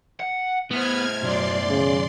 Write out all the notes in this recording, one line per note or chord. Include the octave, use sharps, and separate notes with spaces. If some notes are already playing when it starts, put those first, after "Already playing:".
F#5
A2 B3 C5 F6 G#6
B1 F#2 F#3 D5 C6
C#3